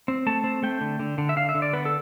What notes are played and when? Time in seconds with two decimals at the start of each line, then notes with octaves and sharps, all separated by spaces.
0.08 C4
0.27 A3 A5
0.44 C4
0.63 A3 G5
0.81 D3
1.00 D3
1.18 D3
1.29 E5
1.36 D3 F5
1.49 E5
1.55 D3
1.62 D5
1.73 B3 B4
1.85 A4